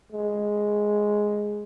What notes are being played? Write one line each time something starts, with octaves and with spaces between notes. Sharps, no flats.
G#3